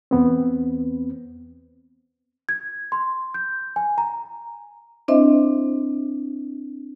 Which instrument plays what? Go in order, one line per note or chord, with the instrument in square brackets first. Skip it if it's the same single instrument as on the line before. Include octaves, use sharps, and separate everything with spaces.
[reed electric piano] E2 B3 C4
[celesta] G#6
C6
G6
G#5
A#5
[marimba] C4 D4 E4 C5 D#5 E5